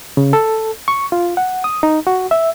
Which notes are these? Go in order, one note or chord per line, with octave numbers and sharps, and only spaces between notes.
C#3
A4
C#6
F4
F#5
D#6
D#4
F#4
E5